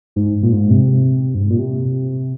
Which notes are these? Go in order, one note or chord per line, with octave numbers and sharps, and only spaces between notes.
G#2
A#2
G#2
C3
G2
G#2
A#2
C3